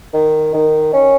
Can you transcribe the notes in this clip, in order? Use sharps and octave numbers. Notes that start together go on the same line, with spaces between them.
D#3
D#3
C#4